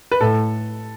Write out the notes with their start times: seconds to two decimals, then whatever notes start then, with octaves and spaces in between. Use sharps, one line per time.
0.12 B4
0.21 A2 A4